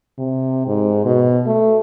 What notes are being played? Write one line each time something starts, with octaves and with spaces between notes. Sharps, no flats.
C3
G#2
B2
A3